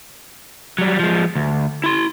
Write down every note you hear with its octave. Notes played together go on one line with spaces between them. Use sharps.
F#3 G3
F3 G#3
D2
E4 C6